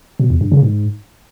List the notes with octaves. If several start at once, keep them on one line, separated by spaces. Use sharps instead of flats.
B2
E2
G2
C#3
G#2